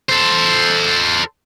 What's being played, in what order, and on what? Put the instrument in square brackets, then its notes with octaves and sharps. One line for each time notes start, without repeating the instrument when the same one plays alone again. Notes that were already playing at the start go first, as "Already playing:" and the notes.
[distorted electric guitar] A4 C5